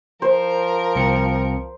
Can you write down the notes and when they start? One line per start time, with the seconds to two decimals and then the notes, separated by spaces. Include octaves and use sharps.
0.22 F3 A#4 C5
0.96 C2 C4 C#7